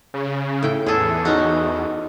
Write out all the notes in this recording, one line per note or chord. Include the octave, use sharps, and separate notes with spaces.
C#3
A2 G5
E2 G#4 A4
C#4 D#4 F#4